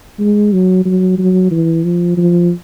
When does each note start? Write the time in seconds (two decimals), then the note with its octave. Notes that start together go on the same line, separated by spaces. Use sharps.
0.19 G#3
0.53 F#3
0.86 F#3
1.18 F#3
1.51 E3
1.84 F3
2.17 F3